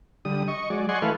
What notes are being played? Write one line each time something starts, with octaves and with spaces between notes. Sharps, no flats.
D3 G3 D#6
D#5 C#6
F#3 G#3 D5
D5 D#5 F#5 G#5 C6 C#6
E3 A3 A4 B4 F5